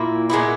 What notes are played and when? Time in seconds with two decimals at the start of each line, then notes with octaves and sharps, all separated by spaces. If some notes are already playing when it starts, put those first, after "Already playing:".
Already playing: A#2 A#3 E4
0.30 A#2 G#3 B3 E4